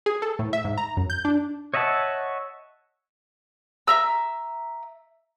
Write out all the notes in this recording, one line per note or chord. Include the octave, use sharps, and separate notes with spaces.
G#4
A4
A2
E5
G#2
A#5
F#2
G6
D4
C#5 D#5 E5 F#5 A5
E5 A#5 E6